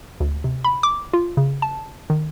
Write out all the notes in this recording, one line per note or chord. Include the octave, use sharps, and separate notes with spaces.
D2
C3
B5
D6
F4
C#3
A5
D#3